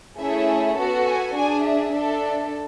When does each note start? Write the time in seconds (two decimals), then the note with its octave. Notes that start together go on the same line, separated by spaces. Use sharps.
0.19 A3 C#4 E4 G#4 E5
0.77 B3 F#4 A4
1.06 G#5
1.35 D4 G#4 G#5
1.65 E5
1.93 D4 A4